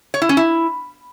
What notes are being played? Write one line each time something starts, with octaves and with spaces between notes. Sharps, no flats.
C#5
E4
C#4
E4